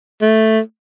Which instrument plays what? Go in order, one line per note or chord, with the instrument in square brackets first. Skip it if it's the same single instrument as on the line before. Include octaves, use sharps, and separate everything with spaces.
[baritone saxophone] A3